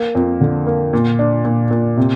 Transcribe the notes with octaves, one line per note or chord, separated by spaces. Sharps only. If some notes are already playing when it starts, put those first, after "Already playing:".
Already playing: A#3
F2
D3
A#3
A#2
D4
A#2
A#2
C3